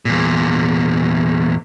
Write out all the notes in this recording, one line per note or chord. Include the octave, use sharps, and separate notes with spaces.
E2 A#2